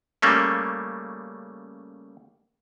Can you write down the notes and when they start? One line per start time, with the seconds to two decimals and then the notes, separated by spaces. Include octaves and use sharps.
0.22 C#3 G3 A3 A#3 C#4